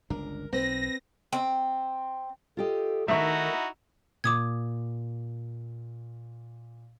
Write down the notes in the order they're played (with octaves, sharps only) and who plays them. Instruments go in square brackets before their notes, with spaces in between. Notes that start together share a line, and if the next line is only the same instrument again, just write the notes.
[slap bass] G1 C#2 D4 [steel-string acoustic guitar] A#4
[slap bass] B1 [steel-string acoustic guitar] C4 B4 [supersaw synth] A#6
[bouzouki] C4
[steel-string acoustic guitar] F4 G4 D#5 [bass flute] A4
[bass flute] D#3 [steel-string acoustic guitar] A3 A#4 [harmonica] D#4 E4 F#4 [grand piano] E5 C#6
[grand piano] A#2 [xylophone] D6 D#6 G#6